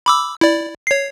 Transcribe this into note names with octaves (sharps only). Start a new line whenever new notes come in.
B5 D6 E6
E4 D5
C#5 C7